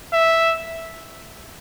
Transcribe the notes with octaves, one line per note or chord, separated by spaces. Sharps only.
E5